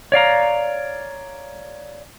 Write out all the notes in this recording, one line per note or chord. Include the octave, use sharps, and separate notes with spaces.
C#5 D5 F5 A#5